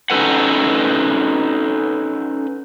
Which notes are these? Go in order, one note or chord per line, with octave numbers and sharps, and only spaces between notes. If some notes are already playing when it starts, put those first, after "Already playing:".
C#4 D#4 E4 A4 B4 F#5